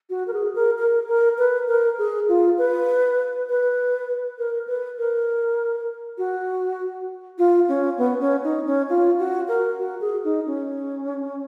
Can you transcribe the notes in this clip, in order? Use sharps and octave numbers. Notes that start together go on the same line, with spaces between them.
F#4
A#4
G#4
A#4
A#4
A#4
B4
A#4
G#4
F4
B4
B4
A#4
B4
A#4
F#4
F4
C#4
B3
C#4
D#4
C#4
F4
F#4
A#4
F#4
G#4
D#4
C#4